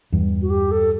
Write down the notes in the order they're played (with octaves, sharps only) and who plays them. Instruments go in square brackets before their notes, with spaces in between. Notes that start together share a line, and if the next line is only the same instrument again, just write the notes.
[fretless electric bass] E2 G2
[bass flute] F#4
G4
A4